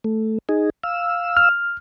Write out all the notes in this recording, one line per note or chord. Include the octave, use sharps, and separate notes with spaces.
A3
D#4 G#4
F5 E6
F6